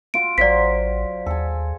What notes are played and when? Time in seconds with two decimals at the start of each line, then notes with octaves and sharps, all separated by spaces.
0.14 F4 F#4 C#6 D7
0.38 A1 F#3 F4 C5 D5 B6
1.26 D#2 G#4 A4